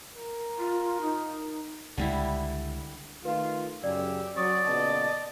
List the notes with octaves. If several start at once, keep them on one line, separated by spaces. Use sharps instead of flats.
A#4
F4
D#4
C#2 D3 G3 G#3 E4
D#3 A3 F4 B4
F#2 C#3 G4 D5 E6
F#3 C#4 D5 F#5 C#6 D#6
A#2 C#3 B3 D#5 A5